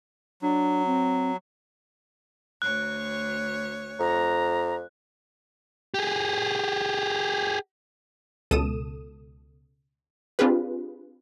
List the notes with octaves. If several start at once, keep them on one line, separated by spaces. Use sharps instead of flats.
F#3 D4
C4
D2 C#5 F#6
F2 A#5
G4 G#4
C#2 B2 A4 D#6 D#7 E7
C4 D4 F4 G4 G#4 B4